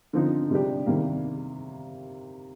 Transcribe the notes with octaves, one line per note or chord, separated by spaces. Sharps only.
D3 F3 C4 D#4
C3 G3 D4 G4
C3 D#3 G3 A#3